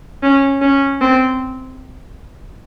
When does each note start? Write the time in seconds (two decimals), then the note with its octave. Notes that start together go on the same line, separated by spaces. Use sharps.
0.22 C#4
0.61 C#4
1.01 C4